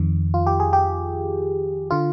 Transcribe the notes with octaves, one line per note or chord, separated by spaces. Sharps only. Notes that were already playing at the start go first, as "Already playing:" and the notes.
Already playing: F2 D#3
F4
G4
G#4
G4
D3 F4